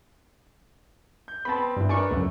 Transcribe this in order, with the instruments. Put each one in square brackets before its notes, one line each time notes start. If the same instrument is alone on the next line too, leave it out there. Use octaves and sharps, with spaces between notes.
[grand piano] G6
[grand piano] B3 C4 [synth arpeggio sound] A5 B5
[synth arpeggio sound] G2 E4
[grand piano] D4 A#4 B4 [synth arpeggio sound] G#5 C#6
[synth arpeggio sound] C#2 F#2 [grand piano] A3